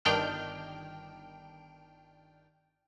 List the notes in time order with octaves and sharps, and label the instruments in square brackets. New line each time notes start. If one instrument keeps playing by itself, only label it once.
[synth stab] G1 D#3 D4 G5 F6